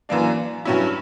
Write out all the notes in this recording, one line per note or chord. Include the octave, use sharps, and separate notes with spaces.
F#2 E3 A#3 D4
G2 F#3 C#4 E4